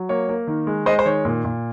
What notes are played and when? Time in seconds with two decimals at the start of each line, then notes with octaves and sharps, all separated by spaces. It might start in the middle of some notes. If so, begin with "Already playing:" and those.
Already playing: F#3
0.09 A#3 C#5
0.29 A#3
0.47 D#3
0.67 G#3
0.86 G#3 C5 D#5
0.99 C5
1.05 D#3 C#5
1.25 A#2
1.45 A#2